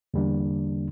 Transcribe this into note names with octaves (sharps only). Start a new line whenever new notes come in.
E2 D3 G3 A#3 D4